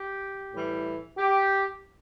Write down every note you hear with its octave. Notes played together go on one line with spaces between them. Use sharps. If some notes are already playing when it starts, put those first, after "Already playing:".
Already playing: G4
A2 E3 G3
G4